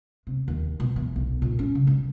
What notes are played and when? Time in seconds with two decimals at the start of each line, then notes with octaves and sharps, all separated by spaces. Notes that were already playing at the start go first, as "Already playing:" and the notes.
0.27 C3
0.48 D#2
0.80 B2
0.96 E3
1.16 B1
1.42 A#2
1.59 C#4
1.75 C#3
1.87 G3